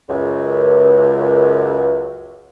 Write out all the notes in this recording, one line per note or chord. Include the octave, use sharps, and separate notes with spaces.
C#2 F#2